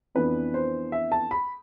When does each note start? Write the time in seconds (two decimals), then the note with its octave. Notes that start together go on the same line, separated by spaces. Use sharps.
0.15 F2 E3 B3 D4 B4
0.54 C5
0.92 E5
1.12 A5
1.31 B5